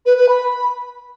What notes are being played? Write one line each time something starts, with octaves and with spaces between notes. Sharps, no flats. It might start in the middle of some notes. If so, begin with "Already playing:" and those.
B4
B4
B5